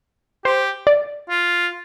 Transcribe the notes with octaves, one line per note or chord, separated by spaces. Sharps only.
G4 C5
D5
F4